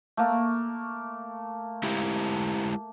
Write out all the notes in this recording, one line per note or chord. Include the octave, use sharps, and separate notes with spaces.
A3 A#3
G#3 E4 G4